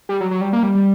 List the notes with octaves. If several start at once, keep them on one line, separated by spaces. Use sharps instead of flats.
G3
F#3
F#3
G3
A#3
G3
G3